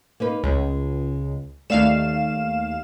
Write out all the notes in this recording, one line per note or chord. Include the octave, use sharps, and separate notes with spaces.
A#3 D#4 B4
C#2 G#3
D#2 A3 D5 E5 F5 E7